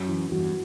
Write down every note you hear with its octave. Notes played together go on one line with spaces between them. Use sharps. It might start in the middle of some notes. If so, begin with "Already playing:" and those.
Already playing: F#2 F#4
E3
E2 G2 F#4